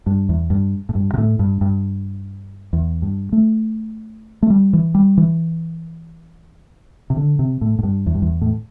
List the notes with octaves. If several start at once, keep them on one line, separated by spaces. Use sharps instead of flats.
G2
E2
G2
A2
G2
C3
A2
G2
G2
E2
G2
A3
A3
G3
E3
G3
E3
C3
D3
C3
A2
A2
G2
E2
G2
E2
A2